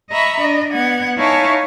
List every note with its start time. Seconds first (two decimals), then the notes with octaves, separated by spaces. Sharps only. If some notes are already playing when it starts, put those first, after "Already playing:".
0.10 D#5 E5 A#5 B5 C#6
0.41 D4 D#5
0.73 B3 F#5 G#6
1.17 D#4 E4 C#5 F5 G#5 A5